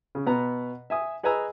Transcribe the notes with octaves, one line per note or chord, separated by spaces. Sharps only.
C#3
B2 B3 B4 A#5
E5 G#5 D#6
G#4 B4 D#5 G#5 A#5 E6